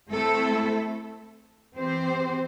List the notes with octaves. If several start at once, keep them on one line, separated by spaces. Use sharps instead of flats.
A3 C4 E4 A4
E3 C4 G4 C5